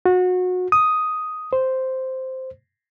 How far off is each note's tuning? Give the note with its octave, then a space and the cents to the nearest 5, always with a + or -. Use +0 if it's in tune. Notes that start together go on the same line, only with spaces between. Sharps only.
F#4 -25
D#6 +5
C5 -5